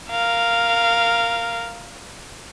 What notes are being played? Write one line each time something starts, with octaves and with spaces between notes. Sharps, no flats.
A#4 F5